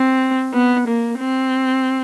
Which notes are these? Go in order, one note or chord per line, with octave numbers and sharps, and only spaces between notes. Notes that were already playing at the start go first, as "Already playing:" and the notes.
Already playing: C4
B3
A#3
C4